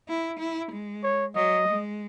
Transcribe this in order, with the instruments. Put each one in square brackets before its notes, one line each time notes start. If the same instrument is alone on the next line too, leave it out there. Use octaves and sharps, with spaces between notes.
[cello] E4
E4
G#3
[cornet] C#5
[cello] F#3 [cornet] D#5
[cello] G#3